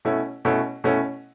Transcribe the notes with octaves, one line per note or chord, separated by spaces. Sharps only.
B2 A3 C#4 E4
B2 A3 C#4 E4
B2 A3 C#4 E4